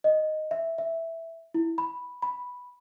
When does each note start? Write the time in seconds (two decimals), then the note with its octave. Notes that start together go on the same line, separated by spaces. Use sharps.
0.04 D#5
0.51 E5
0.78 E5
1.54 E4
1.78 B5
2.22 B5